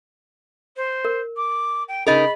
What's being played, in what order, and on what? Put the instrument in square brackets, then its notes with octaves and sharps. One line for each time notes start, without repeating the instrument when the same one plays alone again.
[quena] C5
[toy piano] A#4
[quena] D6
G5
[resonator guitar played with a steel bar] C#3 D#4 A#4 [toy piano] G#4 D#5 [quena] B5